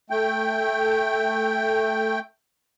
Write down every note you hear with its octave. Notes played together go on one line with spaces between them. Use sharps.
A3 G5